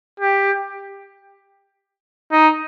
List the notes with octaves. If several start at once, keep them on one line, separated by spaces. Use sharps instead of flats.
G4
D#4